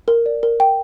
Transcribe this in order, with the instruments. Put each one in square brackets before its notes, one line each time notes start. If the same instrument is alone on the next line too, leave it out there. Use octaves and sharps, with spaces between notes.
[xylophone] A#4
D5
A#4
G5